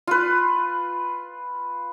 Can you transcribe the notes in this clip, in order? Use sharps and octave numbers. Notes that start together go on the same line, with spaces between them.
F4 B4